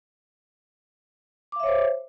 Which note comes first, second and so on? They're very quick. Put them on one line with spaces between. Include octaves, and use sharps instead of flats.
D6 F5 E5 C#5 C5